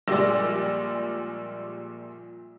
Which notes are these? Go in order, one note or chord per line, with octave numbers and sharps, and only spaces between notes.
A#1 A#2 G3 G#3 D5